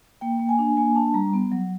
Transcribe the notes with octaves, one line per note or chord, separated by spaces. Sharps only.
A#3 G5
A#3
G#5
D4
A#3 G#5
D4 A5
G3 A#5
B3
F#3